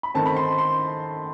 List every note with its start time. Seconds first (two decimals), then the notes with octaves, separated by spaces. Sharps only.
0.03 B5
0.14 D#3 A3 C4 A5
0.26 B5
0.37 C6
0.58 C6